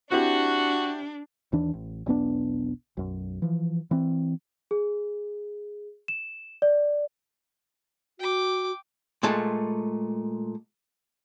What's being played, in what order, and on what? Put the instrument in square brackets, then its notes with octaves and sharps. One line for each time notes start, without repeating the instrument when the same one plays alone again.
[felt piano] C4 E4 G4 [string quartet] D4 [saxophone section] F#4
[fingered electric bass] D#2 E3 D4
A1
E1 B1 B3 D4
B1 F#2
E3 F3
E3 C4
[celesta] G#4
E7
D5
[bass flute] F#4 [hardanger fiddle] G5 D6
[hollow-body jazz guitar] A#2 G#3 A3 A5